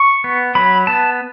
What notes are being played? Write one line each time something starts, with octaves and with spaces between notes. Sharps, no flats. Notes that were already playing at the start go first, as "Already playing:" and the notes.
Already playing: C#6
B3
F#3 B5
B3 A5